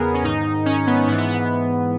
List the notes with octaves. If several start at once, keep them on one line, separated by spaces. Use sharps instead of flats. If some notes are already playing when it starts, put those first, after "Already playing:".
Already playing: E2 C#3 B3 G#4 A#4
C#4
G#2 D#3 D#4
C#4
B3
G#2 E3 B3
B3
B3